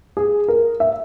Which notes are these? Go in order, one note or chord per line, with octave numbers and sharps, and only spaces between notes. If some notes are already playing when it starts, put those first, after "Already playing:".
G#4
A#4
E5